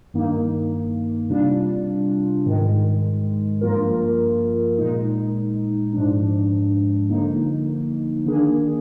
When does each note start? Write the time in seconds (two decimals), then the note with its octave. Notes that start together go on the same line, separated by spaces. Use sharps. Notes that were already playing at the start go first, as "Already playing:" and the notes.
0.14 G2 D#3 A#3 D#4
1.30 C3 G3 D4 F4
2.46 G#2 D#3 G#3
3.61 G2 F3 A#3 F4 A#4
4.78 A#2 G#3 D#4
5.93 G#2 F3 G#3 D4
7.10 D3 F3 A#3 D#4
8.26 D#3 A#3 D4 G#4